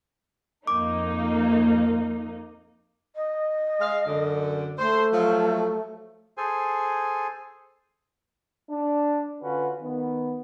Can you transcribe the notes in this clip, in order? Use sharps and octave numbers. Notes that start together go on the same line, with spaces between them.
F2 A#3 D#4 D6
D#5
G#3 F5
F#2 D3
A3 C5
F3 F#3
G#4 A4 C5 G#5
D4
D3 C#4 F4 F#4 B4
D#3 B3